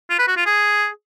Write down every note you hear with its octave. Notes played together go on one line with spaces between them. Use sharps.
F4
B4
F#4
F4
G#4